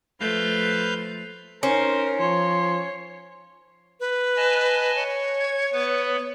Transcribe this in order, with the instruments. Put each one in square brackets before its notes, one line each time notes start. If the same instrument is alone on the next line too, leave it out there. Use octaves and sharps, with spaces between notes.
[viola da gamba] F3 A3 [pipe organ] B4 F5 G6
[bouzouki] C#4 [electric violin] D#4 A#4 [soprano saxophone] C5
[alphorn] F3 [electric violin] C#5 [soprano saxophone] C6
[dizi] B4
[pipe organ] D#5 G#5 A5
[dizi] C#5
[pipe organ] G#6
B3 B4